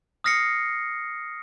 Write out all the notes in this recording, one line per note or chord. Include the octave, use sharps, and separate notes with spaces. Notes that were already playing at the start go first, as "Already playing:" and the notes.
D#6 F6 A#6 C7 C#7